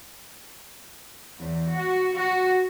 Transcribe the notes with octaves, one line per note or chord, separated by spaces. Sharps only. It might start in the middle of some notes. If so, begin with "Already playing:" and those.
E2
F#4
F#4